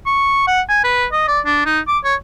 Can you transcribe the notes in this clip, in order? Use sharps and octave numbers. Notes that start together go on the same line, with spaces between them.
C#6
F#5
G#5
B4
D#5
D5
D4
D#4
D6
C#5